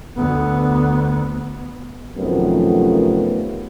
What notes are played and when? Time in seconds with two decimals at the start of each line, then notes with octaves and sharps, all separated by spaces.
0.16 D2 B3
2.18 F#2 C3 D#3 F3 A3 B3